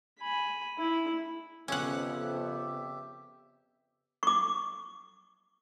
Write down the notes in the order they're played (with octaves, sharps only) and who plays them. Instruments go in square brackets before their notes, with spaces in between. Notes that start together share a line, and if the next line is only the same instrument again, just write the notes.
[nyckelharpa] G#5 B5
E4
[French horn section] F2 [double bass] C#3 B3 [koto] C#4 F#5 [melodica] G4 E5
[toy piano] C#6 D6